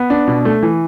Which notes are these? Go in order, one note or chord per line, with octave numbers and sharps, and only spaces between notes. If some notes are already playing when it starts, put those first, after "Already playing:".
Already playing: B3
D4
B2
A3
E3